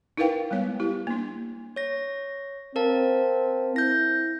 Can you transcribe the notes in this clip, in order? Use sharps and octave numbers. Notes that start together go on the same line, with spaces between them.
D#4 E4 A#4 B4 F5 G5
G3 G#3 B3 C#5
E4 G4
A#3 D4
C#5 A#6
C4 A#4 F5 A5
E4 G6 A#6